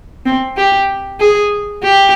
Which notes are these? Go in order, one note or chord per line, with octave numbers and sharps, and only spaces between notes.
C4
G4
G#4
G4